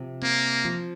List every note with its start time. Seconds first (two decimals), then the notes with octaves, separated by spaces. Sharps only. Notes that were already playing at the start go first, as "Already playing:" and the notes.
Already playing: C3 F3
0.22 A#3 C4
0.65 F3